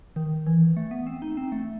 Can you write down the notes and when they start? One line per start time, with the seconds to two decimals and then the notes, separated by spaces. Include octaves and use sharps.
0.16 D#3
0.47 E3
0.77 A3
0.91 B3
1.07 C4
1.22 D#4
1.37 C4
1.52 A3